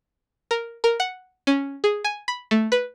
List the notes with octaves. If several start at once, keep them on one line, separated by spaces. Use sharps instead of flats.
A#4
A#4
F#5
C#4
G#4
G#5
B5
A3
B4